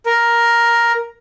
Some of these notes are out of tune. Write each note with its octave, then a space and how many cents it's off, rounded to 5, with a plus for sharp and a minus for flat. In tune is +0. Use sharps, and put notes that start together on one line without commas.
A#4 +5